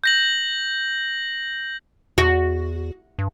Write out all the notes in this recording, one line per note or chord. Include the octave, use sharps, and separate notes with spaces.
G6 A#6 F#7
E2 F#4
G2